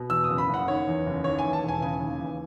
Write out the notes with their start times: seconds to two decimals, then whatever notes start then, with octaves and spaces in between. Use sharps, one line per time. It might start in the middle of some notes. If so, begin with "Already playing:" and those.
Already playing: B2
0.10 E2 E6
0.24 D#6
0.29 F#1
0.38 B5
0.49 F#1 F#5
0.68 D#3 C#5
0.87 E2
1.06 F#1
1.24 D#2 C#5
1.39 G#5
1.44 E3
1.53 A5
1.63 E1
1.68 G#5
1.82 C#3 G#5
2.01 D#2
2.20 E3